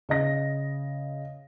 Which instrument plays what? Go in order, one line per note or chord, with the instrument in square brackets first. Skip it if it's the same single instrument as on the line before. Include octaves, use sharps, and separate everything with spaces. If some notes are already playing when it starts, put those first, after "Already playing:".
[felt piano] C#3 D#5 A#6